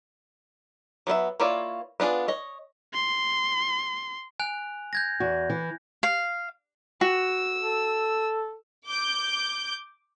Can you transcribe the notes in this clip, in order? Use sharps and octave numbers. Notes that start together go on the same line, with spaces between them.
F#3 B3 A4 E5
A#3 E4 F4 C#5 D5
B3 D4 F4 G#4
C#5 D#5
C6
G#5 F#6 F7
G6 G#6 A#6
E2 F#4
E3
F5
F#4 E6
A4
D6 G6